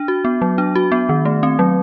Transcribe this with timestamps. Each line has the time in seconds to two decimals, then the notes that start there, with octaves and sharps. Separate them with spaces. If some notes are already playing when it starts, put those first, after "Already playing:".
Already playing: D4
0.08 F#4
0.25 B3
0.42 F#3
0.58 D4
0.75 F#4
0.92 B3
1.09 D#3
1.25 A3
1.43 C4
1.59 F#3